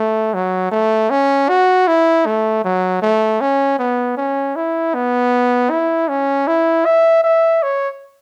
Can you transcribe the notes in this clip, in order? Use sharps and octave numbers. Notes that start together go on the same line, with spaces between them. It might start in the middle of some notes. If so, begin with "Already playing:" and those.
Already playing: A3
F#3
A3
C#4
F#4
E4
A3
F#3
A3
C#4
B3
C#4
E4
B3
E4
C#4
E4
E5
E5
C#5